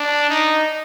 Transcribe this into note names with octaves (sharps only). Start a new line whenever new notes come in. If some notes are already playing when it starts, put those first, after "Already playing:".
Already playing: D4
D#4